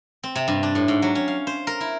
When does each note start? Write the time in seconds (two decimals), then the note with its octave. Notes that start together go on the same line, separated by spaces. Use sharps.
0.24 C4
0.36 C3
0.48 G2
0.63 D4
0.75 A2
0.88 G#2
1.02 F#3
1.15 C#4
1.28 F5
1.47 C5
1.67 A#4
1.80 E4